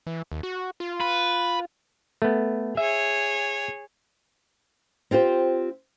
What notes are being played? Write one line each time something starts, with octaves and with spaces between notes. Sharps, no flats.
E3
D#2
F#4
F4
B4
A3 B3
G#4 C#5 E5
C4 F4 G4 C5